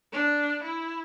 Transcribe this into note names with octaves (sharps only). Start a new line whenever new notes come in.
D4
E4